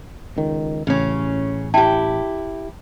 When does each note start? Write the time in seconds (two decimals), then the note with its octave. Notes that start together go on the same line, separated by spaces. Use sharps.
0.37 C#2 D#3
0.87 A1 C#3 C#4
1.74 E4 G4 G5 A5